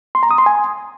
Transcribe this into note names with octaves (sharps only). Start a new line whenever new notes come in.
C6
A#5
D#6
C6
G#5